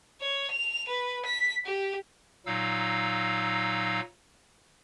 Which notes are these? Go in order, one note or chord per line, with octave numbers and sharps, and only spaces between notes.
C#5
F7
B4
B6
G4
A#2 F#3 D#4 F5 E6